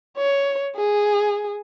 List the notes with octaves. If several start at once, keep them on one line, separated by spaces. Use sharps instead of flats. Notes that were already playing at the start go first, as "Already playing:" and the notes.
C#5
G#4